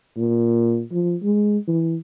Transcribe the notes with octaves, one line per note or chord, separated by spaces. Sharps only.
A#2
F3
G#3
E3